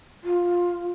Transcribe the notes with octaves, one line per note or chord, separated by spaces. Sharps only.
F4